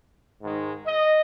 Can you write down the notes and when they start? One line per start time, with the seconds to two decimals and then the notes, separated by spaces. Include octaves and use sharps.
0.42 G#2 D#3 G#3
0.87 D#5